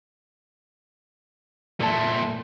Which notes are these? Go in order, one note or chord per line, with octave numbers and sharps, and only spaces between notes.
A#2 A3 A#4 D5 A5